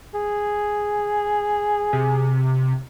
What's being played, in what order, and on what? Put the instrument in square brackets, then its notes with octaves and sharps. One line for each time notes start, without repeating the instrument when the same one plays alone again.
[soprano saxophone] G#4
[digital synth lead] C3